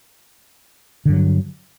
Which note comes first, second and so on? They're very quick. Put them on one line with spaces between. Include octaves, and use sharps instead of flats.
D3 G2 F#3